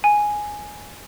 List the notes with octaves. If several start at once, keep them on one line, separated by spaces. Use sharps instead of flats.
G#5